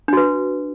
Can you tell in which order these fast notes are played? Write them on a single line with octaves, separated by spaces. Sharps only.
D4 F#4 B4